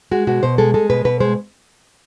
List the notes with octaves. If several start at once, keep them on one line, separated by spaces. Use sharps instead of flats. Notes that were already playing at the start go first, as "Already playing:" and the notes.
G#3 F#4
B2 F#4
B2 C5
G#3 A4
G#3 A4
B2 B4
B2 B4
G#3 C5